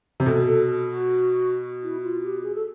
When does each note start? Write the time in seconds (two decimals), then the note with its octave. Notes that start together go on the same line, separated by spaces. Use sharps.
0.20 C3
0.26 B2 A4
0.46 A4
0.86 F#4
1.84 E4
2.03 F4
2.23 G4
2.43 G#4
2.55 A4